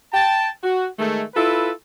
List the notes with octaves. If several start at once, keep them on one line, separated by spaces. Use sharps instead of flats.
G5 A5
F#4
D#3 G#3 A3
E4 F4 A4 B4